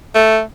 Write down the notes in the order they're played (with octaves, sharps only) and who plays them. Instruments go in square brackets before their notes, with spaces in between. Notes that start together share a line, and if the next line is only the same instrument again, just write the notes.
[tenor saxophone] A3